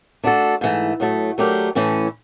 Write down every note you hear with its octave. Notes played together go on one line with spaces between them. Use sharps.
A3 D4 F#4 A4
G#2 E3 A3
A2 F#3 A3
F#3 A3 D4 G4 A#4
A2 E3 A3 C#4